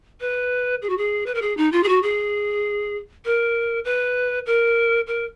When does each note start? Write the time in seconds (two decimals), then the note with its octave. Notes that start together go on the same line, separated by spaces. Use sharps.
0.21 B4
0.82 G#4
0.89 F#4
0.97 G#4
1.26 B4
1.35 A#4
1.42 G#4
1.57 D#4
1.72 F4
1.83 G#4
1.88 F#4
2.03 G#4
3.25 A#4
3.85 B4
4.46 A#4
5.07 A#4